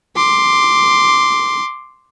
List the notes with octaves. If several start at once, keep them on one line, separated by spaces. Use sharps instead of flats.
C6 D6